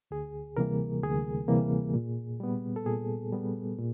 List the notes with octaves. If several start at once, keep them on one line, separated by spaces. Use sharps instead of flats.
D2 G#4
C3 E3 G3 A#3 A#4
D2 G#4
C3 E3 G3 A#3
A#2
G3 B3
A4
A#2 G#4
G3 B3
A#2